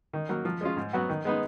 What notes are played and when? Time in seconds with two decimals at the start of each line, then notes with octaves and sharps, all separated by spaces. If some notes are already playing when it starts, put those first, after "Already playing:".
0.14 D#3
0.29 F#3 A#3
0.45 F3
0.61 G#3 C#4 F4
0.77 G#2
0.93 F#3 B3 F#4
1.09 D#3
1.25 G#3 B3 D#4